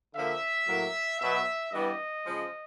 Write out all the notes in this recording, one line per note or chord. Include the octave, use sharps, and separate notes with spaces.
D3 F3 A#3 E5
A2 F#3 A#3
B2 F#3 B3 E5
G2 E3 G3 B3 D#5
C#3 F3 G#3